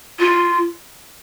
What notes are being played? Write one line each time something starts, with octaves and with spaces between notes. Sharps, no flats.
F4